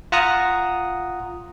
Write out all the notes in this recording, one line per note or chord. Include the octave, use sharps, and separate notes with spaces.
F4 F#5 A#5 D#6